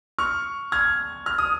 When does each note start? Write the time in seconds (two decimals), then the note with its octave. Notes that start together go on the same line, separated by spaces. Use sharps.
0.18 C#6 F6
0.72 F6 G#6
1.26 F6
1.38 D#6